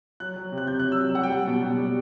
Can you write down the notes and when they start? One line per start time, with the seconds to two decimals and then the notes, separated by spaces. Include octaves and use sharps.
0.20 F#3 F#6
0.36 F#3
0.52 C3
0.58 F#6
0.67 C3 G6
0.79 F#3 F#6
0.92 E6
1.00 F#3
1.15 G3 F#5
1.23 G5
1.31 G3 F#5
1.47 B2
1.62 B2
1.78 G3